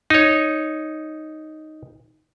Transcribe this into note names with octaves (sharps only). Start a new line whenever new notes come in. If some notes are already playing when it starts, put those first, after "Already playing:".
D#4 C#5